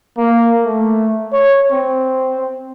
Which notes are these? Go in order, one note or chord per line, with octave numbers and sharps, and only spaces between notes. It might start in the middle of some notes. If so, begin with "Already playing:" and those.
A#3
A3
C#5
C4